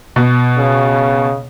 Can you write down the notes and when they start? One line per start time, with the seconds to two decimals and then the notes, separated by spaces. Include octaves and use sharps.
0.16 B2
0.58 C#3